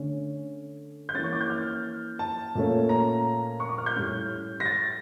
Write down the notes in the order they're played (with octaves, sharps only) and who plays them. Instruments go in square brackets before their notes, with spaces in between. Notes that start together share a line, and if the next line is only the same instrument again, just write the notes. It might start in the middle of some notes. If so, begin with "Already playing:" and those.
Already playing: [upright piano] D3 A3 C#4
G6
E3 A#3 C#4 A6
C#6
D6
G6
F6
A5
A#2 A3 C#4
A#5
C#6
D6
F6
G6
A2 G3 C#4
A#6
A6